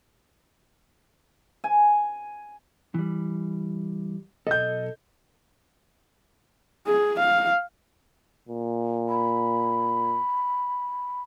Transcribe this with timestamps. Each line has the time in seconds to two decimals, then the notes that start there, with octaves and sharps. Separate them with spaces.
1.64 G#5
2.94 E3 G3
4.47 B1 G2 A4 D#5 G6
6.87 G#4
7.20 F5
8.49 A#2
9.09 B5